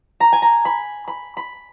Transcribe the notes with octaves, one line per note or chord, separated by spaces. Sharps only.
A#5
G#5
A#5
B5
B5
B5